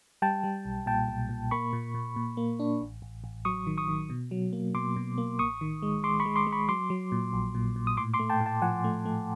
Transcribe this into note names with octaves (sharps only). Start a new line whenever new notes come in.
G3 G5 A5
G3
B1
A#2 G5 A5
B1
A#2
A#3 B5 C#6
A#2
A#2
A#2
A#3
D4
A1
A1
A1
F#3 C#6 D#6
D#3
C#6 D#6
D#3
B2
F#3
A#3
B2 C6 D6
B2
A#3
A1 C#6 D#6
D#3
G#3
G#3 C6 D6
B5 C#6
G#3
C6 D6
G#3
B5 C#6
F#3 C6 D6
F#3
A#2
A#1
A#2
A#2
D#6
A2 C6 D6
C6 D6
A3
G5 A5
A2
G5 A5
F3 F#5 G#5
A3
A3